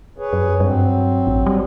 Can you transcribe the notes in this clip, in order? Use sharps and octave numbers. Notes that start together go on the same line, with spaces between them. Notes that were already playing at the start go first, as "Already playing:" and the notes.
G#4 B4 C#5
F#2
G2 F#3 C4
A1
G3